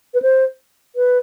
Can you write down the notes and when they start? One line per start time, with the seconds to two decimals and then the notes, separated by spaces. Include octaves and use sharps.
0.14 B4
0.22 C5
0.96 B4